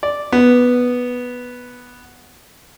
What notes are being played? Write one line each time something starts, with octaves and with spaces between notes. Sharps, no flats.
D5
B3